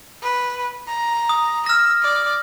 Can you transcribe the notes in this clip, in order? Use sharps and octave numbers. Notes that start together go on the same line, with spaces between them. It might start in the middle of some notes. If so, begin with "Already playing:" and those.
B4
A#5
D#6
E6 F6 A#6
D5